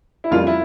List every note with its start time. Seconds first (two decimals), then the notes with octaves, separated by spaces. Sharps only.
0.24 E4
0.31 F2 C#3 E3 G3 A#3 F4
0.47 E4